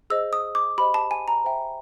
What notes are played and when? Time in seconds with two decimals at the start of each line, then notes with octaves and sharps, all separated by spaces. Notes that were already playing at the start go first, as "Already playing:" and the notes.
0.10 G#4 C5 D#5 E6
0.33 D#6
0.55 D6
0.78 G4 C5 D#5 B5
0.94 A5
1.11 G#5
1.28 A#5
1.44 C5 E5 G5